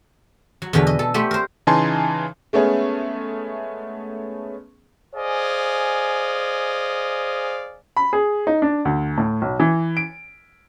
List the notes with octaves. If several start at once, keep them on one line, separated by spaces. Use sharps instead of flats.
F#3
E2 B2 D3 B4
D#5
A4
A3 B3 G4 C5
A#4 C5
C#3 E3 D#4 G#5 A5 C6
G#3 A3 B3 C#4 G#4
G#4 C5 D5 D#5 F5 G#5
B5
G#4
D#4
D4
D2
A2
B1
E3
D7